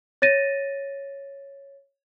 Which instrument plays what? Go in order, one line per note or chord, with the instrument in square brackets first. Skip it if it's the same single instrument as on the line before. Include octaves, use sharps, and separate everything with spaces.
[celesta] C#5 A6 A#6 D#7